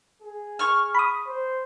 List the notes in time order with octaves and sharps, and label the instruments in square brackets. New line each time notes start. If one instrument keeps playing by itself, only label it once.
[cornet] G#4
[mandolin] C#6 F6
[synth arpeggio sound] B5 D#6
[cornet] C5